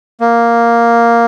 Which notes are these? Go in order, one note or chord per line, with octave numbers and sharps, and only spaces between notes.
A#3